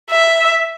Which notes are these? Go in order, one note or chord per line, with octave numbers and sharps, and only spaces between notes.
E5